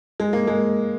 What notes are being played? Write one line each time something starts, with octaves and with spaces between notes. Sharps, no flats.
G#3
A#3
G#3